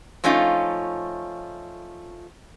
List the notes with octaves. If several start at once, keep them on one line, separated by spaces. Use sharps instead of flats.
F3 A3 C#4 D#4 F4